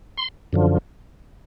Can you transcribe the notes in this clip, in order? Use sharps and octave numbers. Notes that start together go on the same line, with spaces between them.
C6
F#2 D3 F3